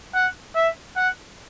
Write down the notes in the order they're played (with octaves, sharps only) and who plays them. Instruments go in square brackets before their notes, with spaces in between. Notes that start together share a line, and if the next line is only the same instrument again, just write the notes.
[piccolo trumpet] F#5
E5
F#5